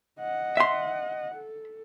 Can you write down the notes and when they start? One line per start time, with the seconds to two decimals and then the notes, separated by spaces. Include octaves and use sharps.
0.19 D#5 F#5
0.57 E5 C6
1.34 A4